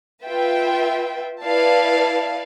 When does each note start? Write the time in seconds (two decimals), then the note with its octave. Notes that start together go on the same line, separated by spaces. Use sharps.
0.25 F4 B4 E5 G5
1.43 E4 B4 D5 F5 A5